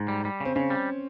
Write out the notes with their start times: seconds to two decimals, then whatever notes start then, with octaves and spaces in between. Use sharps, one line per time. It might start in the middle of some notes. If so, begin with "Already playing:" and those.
Already playing: G#2
0.08 G3
0.25 G3
0.40 C#3 C4
0.56 C#3 C#4
0.70 G3